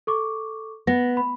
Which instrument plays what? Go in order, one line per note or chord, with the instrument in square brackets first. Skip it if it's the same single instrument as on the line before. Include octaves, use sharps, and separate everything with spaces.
[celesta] A4 C#6 D6
[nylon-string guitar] B3 [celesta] A#6
[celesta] B5